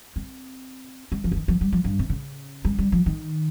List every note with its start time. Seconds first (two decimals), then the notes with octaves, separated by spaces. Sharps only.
0.16 C4
1.12 G#3
1.24 F3
1.32 C#3
1.36 D#3
1.48 F3
1.61 G3
1.72 F3
1.84 G2
1.99 C3
2.10 C#3
2.65 G#3
2.78 G3
2.92 F3
3.06 D#3